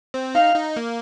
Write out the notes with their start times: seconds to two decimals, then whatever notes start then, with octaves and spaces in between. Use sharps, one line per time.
0.14 C4
0.35 D#4 F5
0.55 D#4
0.76 A#3